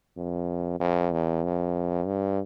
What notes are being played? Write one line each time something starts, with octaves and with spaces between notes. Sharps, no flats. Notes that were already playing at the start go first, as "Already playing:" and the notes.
F2
F2
E2
F2
G2